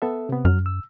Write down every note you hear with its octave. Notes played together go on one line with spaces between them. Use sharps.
B3 A4 E5
C3 B3
F#2 F#3 F6
E6